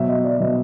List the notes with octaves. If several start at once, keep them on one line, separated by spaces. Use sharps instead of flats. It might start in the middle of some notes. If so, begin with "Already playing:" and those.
Already playing: B2 F#3 E5
D#5
D5
B2 F#3 D#5